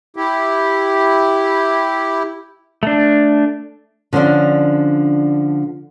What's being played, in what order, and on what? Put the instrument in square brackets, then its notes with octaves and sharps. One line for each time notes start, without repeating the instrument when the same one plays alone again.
[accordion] E4 G4
[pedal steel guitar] A3 D4
[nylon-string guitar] D3 F3 G3 C#4 D4